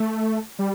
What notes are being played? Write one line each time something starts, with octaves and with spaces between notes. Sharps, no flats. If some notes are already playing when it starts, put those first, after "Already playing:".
Already playing: A3
G3